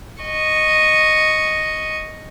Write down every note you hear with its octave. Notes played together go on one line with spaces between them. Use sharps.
D#5 C#6